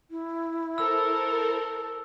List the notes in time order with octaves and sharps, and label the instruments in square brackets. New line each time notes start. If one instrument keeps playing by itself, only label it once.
[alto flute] E4
[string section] A4 A#4 C5 [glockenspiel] E6